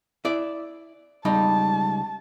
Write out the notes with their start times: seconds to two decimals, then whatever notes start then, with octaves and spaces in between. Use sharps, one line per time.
0.25 E4 D5
1.25 C#2 G3 D#4 A5